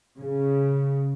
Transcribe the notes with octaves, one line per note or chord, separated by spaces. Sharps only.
C#3